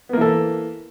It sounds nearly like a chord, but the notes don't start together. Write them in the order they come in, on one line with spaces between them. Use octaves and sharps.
B3 A#3 E3 A4